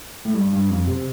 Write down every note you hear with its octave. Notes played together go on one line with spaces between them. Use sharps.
A2
G2
G2
F2
C3